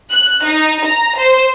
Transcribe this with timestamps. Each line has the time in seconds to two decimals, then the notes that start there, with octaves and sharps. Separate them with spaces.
0.12 F#6
0.45 D#4
0.87 A#5
1.19 C5